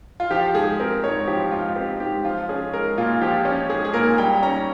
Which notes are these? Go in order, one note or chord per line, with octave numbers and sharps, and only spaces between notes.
F4
F3 G4
G#2 G#4
C4 A#4
G#2 C#5
F3 G4
G#2 F4
C4 G4
G#2 G4
F3 F4
C#4 G#4
G#3 A#4
A#2 F4
F3 G4
C#4
G#3 G#4
G#4
A#2 A#4
G3 G5
C#4 A#5